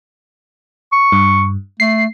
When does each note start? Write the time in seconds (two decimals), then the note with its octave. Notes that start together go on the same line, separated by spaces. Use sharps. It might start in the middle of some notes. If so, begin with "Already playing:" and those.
0.93 C#6
1.12 G2
1.80 A3 C7